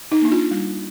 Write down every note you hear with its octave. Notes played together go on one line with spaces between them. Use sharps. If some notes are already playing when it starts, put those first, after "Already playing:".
D#4
A#3 D4
F4
G3